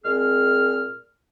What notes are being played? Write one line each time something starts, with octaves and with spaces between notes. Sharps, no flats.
A#2 G#3 C4 G#4 F6